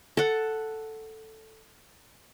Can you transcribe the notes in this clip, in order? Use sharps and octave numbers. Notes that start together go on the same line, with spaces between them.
A4 F#5